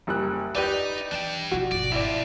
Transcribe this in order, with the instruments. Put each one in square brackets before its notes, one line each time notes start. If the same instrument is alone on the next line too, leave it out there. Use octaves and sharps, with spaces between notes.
[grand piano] F#1 G3 F#6
[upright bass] D#2 [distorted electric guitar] D#4 [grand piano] G4 B4 D5
[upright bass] E3 C#4 [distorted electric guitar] D4 G5
[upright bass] B2 F3 [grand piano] F#4
[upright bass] G#1 B2 [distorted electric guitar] D5
[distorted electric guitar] F3 C4 [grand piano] E4 D5